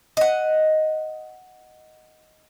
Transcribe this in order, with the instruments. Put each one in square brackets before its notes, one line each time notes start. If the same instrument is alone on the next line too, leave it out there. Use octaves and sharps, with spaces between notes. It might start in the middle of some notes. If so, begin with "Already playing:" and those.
[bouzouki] D#5 F#5